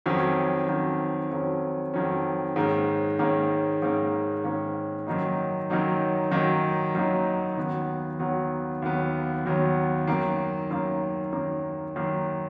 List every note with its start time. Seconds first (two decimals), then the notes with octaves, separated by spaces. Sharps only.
0.06 F2 D#3 F#3 C#4
0.69 F2 D#3 F#3 C#4
1.31 F2 D#3 F#3 C#4
1.94 F2 D#3 F#3 C#4
2.56 G#2 D#3 A#3 C#4
3.19 G#2 D#3 A#3 C#4
3.82 G#2 D#3 A#3 C#4
4.44 G#2 D#3 A#3 C#4
5.07 F#2 D#3 F#3 A#3 D#4
5.70 F#2 D#3 F#3 A#3 D#4
6.31 F#2 D#3 F#3 A#3 D#4
6.95 F#2 D#3 F#3 A#3 D#4
7.57 D#2 D#3 F#3 B3
8.19 D#2 D#3 F#3 B3
8.82 D#2 D#3 F#3 B3
9.45 D#2 D#3 F#3 B3
10.07 F#2 D#3 A#3
10.70 F#2 D#3 A#3
11.32 F#2 D#3 A#3
11.96 F#2 D#3 A#3